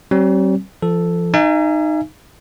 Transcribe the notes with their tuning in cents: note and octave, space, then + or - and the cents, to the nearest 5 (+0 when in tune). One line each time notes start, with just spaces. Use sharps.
G3 -45 C4 +35
F3 -30 A4 +0
D#4 -10 E5 +45 G#5 +0